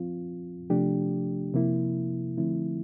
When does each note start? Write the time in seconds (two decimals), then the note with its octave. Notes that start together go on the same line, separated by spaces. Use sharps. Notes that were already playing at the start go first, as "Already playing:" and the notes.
Already playing: F3 C4 F4
0.70 C3 F3 A3 D4 G4
1.54 C3 F3 A#3 E4
2.38 D3 F3 A3 C4 E4